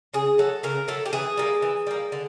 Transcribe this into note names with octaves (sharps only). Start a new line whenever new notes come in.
C#3 G#4
F#3 A3 A4
C#3 A#4
F#3 A3 A4
G4
E3 G#4
G3 A#3
E3
G3 A#3
D3